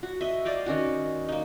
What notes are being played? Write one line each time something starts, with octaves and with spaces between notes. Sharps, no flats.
F#4
D#5 E5
D5 D#5 F5 G5
D#3 C#4 F#4
A#3 D#4